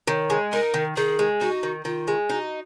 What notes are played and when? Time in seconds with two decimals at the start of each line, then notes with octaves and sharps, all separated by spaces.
0.07 D#3 C#5
0.30 G#3
0.52 D#4 A#4
0.74 D#3
0.96 D#3 G#4
1.19 G#3
1.41 D#4 F#4
1.63 D#3
1.85 D#3 F4
2.08 G#3
2.30 D#4 F#4